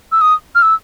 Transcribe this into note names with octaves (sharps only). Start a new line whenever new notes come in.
E6
D#6
F6
E6